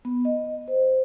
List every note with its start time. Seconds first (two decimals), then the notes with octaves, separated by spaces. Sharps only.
0.05 B3
0.25 D#5
0.68 C5